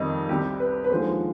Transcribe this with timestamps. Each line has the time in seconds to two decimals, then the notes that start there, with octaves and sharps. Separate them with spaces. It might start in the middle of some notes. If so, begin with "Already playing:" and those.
Already playing: F2 D#3 G3 D#4
0.29 C2 C3 G3 G4
0.60 B4
0.84 B4
0.90 D#2 D3 F3 G#3 C5